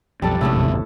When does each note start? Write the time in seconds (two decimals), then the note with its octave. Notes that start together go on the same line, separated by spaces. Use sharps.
0.22 B1 F2 G3 D4 A4
0.41 A#1 A2 C3 G#3 A3 E4
0.54 G1 D#2 B2